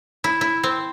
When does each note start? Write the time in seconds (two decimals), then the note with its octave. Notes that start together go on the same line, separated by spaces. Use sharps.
0.24 E4
0.41 E4
0.64 C4